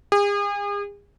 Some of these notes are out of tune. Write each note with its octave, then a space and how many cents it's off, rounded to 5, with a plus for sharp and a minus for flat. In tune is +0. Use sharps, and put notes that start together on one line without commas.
G#4 -40